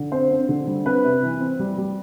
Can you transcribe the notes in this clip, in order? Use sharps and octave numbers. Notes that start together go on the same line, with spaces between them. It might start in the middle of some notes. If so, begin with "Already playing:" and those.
Already playing: D3
C4 C5
C4
D3
G3
C4 B4
C3
E3
C4
G3
G3